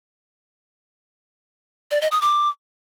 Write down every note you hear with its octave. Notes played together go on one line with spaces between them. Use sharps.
D5
D#5
D#6
D6